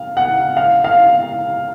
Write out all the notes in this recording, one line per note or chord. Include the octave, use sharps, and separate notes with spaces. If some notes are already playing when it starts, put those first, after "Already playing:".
Already playing: F5
F#5
F5
F5